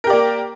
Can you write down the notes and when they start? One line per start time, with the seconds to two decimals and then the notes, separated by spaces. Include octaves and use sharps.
0.04 A#4
0.07 G4
0.10 D5
0.13 A#3